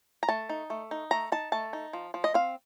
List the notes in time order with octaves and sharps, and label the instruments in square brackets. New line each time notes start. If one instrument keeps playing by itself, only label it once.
[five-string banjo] A#5
A3 A5
D#4
A3
D#4
A3 A#5
D#4 A5
A3 A5
D#4
F3
F3
D#5
C4 F5